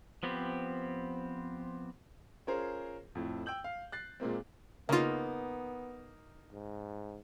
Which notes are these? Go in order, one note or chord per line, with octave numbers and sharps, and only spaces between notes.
F3 B3 C4 G4
C#4 F4 G#4 A#4 C5
F2 A2
G5 E6 G6 F#7
F5
F#6 A6 C7
A#2 G#3 A#3 C4
C#3 A#3 B3 D#4 F4
G#2